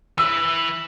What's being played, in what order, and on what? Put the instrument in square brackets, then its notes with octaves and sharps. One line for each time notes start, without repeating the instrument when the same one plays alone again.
[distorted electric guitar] E3 B4 [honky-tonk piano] E6